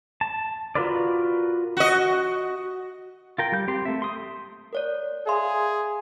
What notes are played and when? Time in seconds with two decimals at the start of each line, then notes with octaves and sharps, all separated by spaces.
0.21 A5
0.75 F4 F#4 A#4 B4 D5
1.77 F#4 D#5
3.38 F4 A#4 G5
3.52 G3 G6
3.68 C4 G4 C6
3.85 A3 E5
4.02 C6 D#6
4.73 A#4 C#5 D5
5.27 G#4 E5 F5 C6